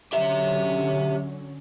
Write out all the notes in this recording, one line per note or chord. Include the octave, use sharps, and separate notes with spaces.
D3 F#3 C#4 G4 E5